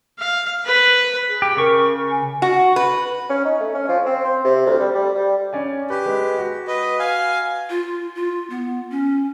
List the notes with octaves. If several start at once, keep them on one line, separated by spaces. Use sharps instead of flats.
F5
B4
G#4
G4
C#3 A#4 C#6
G#5
F#4
B4
C#4
D#4
A3
C#4
F3
C4
C5
C3
D2
G3
G3
G3
C#4 D5 G#5
G4 B4
G#3 B4
F#4
B4 D#5
F5 G#5
F4
F4
B3
C#4